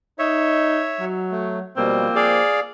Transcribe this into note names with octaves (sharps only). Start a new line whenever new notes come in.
D#4 C#5 E5
F#3
A3
B2 F3 G3 A#3 C4
G#4 D5 F5